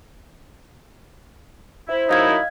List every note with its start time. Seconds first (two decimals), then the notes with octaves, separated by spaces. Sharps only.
1.88 E4 C5
2.09 F#2 D#4 E4 D#5 F5 G#6